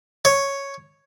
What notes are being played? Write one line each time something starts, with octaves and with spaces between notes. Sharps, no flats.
C#5